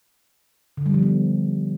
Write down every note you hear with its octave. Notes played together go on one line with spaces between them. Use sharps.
D3
G3
F3
B3